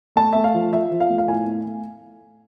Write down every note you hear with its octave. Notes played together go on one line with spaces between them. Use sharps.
A3 A5
A3 E5
F5
F3
F3 E5
F3
F5
A3
F5
A2 G#5
A3
A3